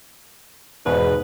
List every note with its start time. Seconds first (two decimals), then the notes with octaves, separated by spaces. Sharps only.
0.86 E2 G#2 B2 B4